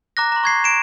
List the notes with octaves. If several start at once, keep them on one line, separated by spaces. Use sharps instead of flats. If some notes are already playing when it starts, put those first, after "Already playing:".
A#5 D6 F#6 A#6
A#5 C6
C#6 G#6 C7
D7 E7